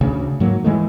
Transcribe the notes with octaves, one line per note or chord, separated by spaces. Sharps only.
D2 C#3
G#2 F#3 A#3
E3 G#3 A3